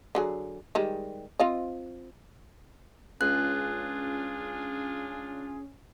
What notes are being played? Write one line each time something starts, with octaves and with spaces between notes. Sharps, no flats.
D3 F#3 G#4
D#3 G3 G#3
C4 F4 D#5
C#2 C#4 D4 F4 G#4 F#6